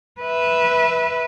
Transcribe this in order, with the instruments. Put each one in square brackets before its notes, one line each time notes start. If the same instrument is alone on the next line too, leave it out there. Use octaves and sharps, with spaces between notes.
[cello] B4 E5